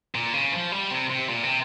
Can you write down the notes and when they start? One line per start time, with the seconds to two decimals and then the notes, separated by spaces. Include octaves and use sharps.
0.15 A#2
0.34 C#3
0.52 F3
0.72 G3
0.91 C3
1.10 C3
1.29 A#2
1.43 C3